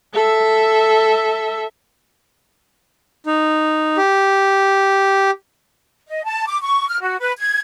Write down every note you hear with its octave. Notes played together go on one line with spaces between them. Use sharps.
A4 E5
D#4
G4
D#5
A5
D6
C#6
F6
F#4
B4
G#6